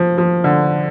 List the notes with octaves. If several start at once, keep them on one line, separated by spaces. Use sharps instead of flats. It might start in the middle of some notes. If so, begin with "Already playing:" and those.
Already playing: F3
F3
D3